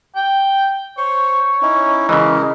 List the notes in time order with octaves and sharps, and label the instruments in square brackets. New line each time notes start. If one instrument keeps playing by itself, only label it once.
[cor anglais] G5
[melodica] C5 C#6 [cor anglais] C#5
[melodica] C#4 D#4 E4
[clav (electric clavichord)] C#3 E3 [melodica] G#3 A#4